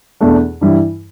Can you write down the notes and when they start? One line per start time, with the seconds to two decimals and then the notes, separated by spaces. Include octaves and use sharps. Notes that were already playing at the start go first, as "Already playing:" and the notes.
0.21 E2 B2 A3 D4
0.61 G2 E3 G3 E4